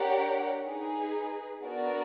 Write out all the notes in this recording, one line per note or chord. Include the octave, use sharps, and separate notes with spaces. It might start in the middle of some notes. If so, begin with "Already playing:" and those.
Already playing: D4 G4 A#4 C#5 F#5
D#4 G#4 B4
B3 D4 F#4 A#4 D5